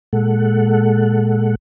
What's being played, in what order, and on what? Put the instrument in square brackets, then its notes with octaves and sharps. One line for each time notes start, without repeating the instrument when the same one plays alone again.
[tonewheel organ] A#2 G#3 A4 F#5